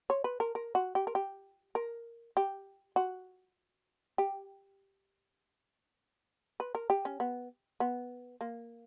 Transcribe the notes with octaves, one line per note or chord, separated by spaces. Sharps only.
C#5
B4
A#4
A#4
F#4
G4
A#4
G4
A#4
G4
F#4
G4
B4
A#4
G4
C#4
B3
B3
A#3